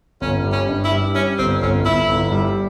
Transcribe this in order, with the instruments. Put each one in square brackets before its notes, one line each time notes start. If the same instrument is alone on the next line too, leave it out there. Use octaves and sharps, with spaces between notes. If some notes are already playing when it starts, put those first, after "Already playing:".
[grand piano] G1 [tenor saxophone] C#4
[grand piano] G3
[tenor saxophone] C#4
[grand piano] G2
[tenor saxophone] E4
[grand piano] G3
[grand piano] G3 [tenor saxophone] C#4
[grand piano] G1 [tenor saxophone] C4
[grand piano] G1 [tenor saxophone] C#4
[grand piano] G1 [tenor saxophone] E4
[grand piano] G1
G3